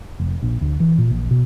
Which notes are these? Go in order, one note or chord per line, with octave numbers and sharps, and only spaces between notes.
F1
A#1
D2
E3
A#2
A#1
B2